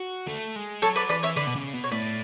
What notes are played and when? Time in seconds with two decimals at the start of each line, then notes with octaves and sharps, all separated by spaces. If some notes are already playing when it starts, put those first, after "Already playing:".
Already playing: F#4
0.28 A3
0.56 G#3
0.82 F#3 A4 C#5
0.96 B4 D5
1.09 E3 B4 D5
1.23 C#5 E5
1.36 D3 B4 D5
1.47 B2
1.56 C#3
1.73 B2
1.84 C#5
1.91 A2 B4 D5